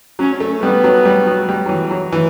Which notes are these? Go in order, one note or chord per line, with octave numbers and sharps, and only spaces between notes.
F#3 C#4
A3
G3 B3
F#3
G3
F#3
G3
F#3
E3
F#3
E3